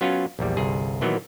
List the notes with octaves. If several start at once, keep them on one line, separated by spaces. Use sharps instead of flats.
F#3 B3 C#4 F4
A#1 E2 G3
G1 C2 G#4
A#2 D#3 E3 F#3 B3